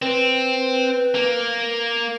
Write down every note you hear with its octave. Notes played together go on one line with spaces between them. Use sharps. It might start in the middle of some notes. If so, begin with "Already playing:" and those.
C4 B4
A#3